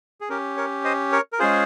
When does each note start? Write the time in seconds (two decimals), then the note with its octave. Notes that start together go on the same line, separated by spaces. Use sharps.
0.21 G#4
0.29 C#4 G4 A#4
0.57 A#4 C#5
0.84 C5 D#5
1.12 A#4 C#5
1.33 A#4
1.39 G#3 C#4 F4 G#4 C5